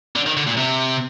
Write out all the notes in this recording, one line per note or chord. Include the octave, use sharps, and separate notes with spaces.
D3
D#3
D3
A#2
C3